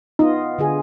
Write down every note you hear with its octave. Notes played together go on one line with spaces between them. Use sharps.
B3 D#4 F4 D#5
D3 F4 G#4